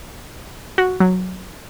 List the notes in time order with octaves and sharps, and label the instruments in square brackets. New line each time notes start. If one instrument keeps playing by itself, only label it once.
[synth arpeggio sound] F#4
F#3